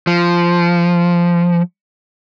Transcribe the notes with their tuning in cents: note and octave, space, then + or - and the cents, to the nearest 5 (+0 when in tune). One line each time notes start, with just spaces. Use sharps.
F3 -10